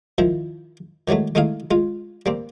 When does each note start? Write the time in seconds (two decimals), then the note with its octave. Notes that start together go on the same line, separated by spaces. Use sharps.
0.18 D#3 F3 E4
1.08 D#3 E3 F#3 G#3 A3
1.35 G#3 A3 D#4 E4 F5
1.71 G#3 F4
2.26 G3 A#3 C4